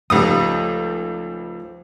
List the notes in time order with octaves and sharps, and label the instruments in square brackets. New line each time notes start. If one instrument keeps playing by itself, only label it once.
[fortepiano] C#2 G3 D#6 [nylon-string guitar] F3 A3 D#4